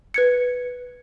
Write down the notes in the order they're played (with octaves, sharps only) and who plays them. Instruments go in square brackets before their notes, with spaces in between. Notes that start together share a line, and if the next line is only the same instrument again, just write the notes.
[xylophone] B4 G#6 C#7